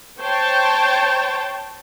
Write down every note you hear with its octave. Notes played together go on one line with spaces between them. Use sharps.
C5 C#5 G5 A5